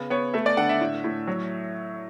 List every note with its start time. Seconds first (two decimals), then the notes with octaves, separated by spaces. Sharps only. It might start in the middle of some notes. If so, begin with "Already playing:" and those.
Already playing: C#3 B3
0.10 B3 C#5
0.34 A3 E5
0.46 D5
0.57 D3 F#5
0.69 E5
0.81 A2
1.04 A2
1.27 F#3